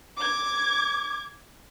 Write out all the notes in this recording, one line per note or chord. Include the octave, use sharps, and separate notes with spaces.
D6 G#6